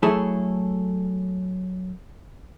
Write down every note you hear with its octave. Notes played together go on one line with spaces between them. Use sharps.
F#3 A3 E4 G#4 A4